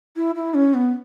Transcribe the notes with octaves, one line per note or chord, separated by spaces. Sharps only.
E4
E4
C#4
B3